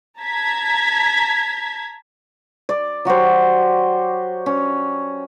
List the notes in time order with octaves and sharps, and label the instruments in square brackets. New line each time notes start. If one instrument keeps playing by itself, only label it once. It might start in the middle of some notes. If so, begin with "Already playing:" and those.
[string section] A5 A#5 G#6 B6
[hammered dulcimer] D5
F#3 F#4 G4 C5
C#4